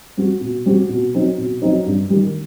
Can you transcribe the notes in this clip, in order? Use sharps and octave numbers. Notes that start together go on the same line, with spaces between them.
G3 C4 F#4
B2
G3 C4 F#4
B2
F#3 C4 D#4
B2
F#3 C4 D#4
G2
D#3 G3